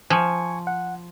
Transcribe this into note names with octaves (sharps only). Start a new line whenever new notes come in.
F3 G#5 C#6
F#5